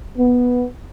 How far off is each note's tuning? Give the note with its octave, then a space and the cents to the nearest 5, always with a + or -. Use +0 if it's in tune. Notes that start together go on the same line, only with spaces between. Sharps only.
B3 -5